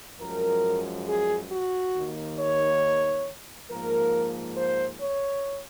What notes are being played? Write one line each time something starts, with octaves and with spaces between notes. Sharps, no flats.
F#2 F3 G#3 A#4
G#4
F#4
D#2 D#3 A#3
C#5
G#2 F3 A#3 A#4
C5
C#5